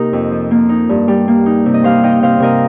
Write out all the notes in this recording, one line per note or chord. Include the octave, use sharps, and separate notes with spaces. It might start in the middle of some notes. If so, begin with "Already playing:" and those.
Already playing: C3 A#3 D#4 G4 A#4 C5 D#5
F2
F3
A#3
D#4
G2
G3
A#3
D#4
C3
D#5
G3 C5 F5
D#4 D#5 G5
C3 C5 F5
C3 A#4 D#5